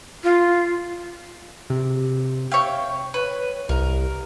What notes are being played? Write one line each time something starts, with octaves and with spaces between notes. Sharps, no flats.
F4
C3
C#5 E5 F5 G5
B4 C#5
C2 A#4